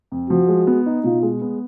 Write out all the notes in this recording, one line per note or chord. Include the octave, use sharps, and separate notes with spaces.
F2
F3 F#4
G#3
B3
D#4
B2 F4
G#3
B3